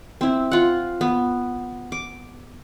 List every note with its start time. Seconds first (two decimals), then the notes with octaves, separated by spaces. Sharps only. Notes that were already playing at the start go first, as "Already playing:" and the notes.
0.21 C4 E4
0.51 F4 F#5
1.01 B3
1.92 D6